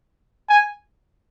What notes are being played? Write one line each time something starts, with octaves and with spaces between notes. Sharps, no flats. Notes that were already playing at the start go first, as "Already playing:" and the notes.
G#5